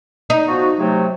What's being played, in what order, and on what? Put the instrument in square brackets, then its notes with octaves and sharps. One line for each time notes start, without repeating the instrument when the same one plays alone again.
[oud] D#4
[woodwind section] F3 B3 F#4
C3 F#3 A3